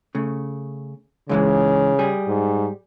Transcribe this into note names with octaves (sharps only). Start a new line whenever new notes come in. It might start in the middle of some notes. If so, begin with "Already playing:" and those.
C#3 A3
G#2 C#3 E3 G#3
G3 G#4
G#2